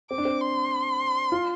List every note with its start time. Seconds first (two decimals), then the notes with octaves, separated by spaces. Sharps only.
0.10 C4 D6
0.18 D4
0.25 C4
0.41 C6
1.32 F4